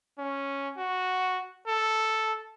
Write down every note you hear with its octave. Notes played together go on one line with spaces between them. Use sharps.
C#4
F#4
A4